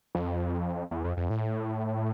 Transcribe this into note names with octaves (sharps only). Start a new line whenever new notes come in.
F2
E2
F2
F2
A2